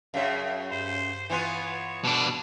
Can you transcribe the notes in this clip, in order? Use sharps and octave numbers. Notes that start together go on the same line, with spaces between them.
F#2 C#3 G#4 C#5 E5 F5
G2 C5
E3 B3 F4 C#5 G#5 C6 F#6
B2 D4